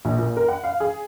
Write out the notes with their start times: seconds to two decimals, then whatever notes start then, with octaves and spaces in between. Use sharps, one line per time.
0.05 A#1
0.18 A#2
0.37 A#4
0.48 F#5
0.64 F5
0.80 G#4